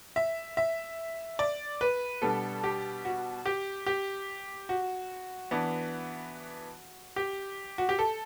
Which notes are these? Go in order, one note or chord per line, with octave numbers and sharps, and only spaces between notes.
E5
E5
D5
B4
B2 G3 B3 D4 A4
G4
F#4
G4
G4
F#4
E3 B3 D4
G4
F#4
G4
A4